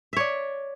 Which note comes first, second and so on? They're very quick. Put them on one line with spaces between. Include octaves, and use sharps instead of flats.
E5 C#5 D5